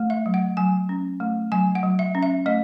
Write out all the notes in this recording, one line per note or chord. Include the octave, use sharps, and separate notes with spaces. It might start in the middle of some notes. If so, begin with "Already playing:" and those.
Already playing: A3
E5
F#3
F#5
F#3 G#5
C#4
A3
F#3 G#5
F#5
F#3
E5
C#4
E5
A3 D#5